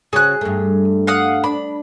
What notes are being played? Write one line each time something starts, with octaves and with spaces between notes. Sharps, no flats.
C#3 C#4 F#4 G#4 F#6
G2 A3
F5 F#5 D#6
D4 B5